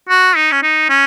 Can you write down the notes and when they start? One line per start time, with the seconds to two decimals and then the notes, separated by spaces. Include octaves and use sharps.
0.09 F#4
0.36 D#4
0.52 C#4
0.63 D#4
0.89 C#4